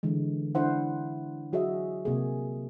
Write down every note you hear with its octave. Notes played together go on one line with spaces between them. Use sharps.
D3 E3 G#3
D4 E4 C5 F#5
F#3 F#4 G#4 D#5 E5
C3 A#3 G#4